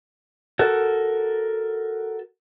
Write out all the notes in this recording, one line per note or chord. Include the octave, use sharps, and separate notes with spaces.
F#4 A4 A#4